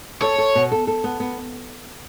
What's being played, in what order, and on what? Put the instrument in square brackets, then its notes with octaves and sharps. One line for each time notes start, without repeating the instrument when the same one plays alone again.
[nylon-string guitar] A4 [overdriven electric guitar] C#5
[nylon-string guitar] A4
B2
A4
A4
B3
B3